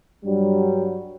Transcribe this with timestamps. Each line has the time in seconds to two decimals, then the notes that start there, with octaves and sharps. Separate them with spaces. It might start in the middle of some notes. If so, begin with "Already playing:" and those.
0.25 G2 F#3 G3